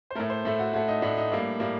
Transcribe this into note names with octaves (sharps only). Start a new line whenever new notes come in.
C5
A2 A3 A#4
C5
A2 A3 A4
F#4
A2 A3 F#4
D#4
A2 A3 D4
D#4
A2 G3 A#3 D4
A2 G3 A#3